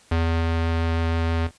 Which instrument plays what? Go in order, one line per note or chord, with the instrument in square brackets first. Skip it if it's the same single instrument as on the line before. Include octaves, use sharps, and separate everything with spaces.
[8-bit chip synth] E2